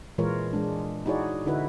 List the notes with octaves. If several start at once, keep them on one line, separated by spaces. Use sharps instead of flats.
A#2 E3 G#3 F4 A#4 C#5
G#3 D4
D#4 E4 F#4 G#4 C#5 D5
D3 D#4 E4 F#4 B4